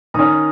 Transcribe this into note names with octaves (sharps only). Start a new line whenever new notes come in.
D#3 C#4 A#5 D#6